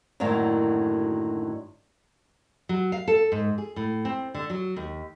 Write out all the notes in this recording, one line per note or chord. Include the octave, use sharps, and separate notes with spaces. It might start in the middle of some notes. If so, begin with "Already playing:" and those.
F#2 A2 D3 D#3 F#3 A#3
F#3
F5
A4
G#2
G#4
A2
C4
D3
F#3
D#2